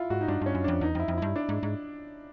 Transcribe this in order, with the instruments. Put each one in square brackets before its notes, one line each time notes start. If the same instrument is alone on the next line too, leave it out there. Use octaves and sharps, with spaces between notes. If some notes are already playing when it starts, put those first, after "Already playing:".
Already playing: [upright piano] E4 F4
[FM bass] G#2 [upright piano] F#4
[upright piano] D#4
[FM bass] G2 [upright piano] D4
[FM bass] G2 [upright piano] C#4
[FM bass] F#2
[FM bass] F2 [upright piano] D4
[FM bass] E2 [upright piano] D#4
[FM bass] F2
[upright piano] E4
[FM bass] F2
[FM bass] G2 [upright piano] E4
[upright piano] D4
[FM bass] G#2
G#2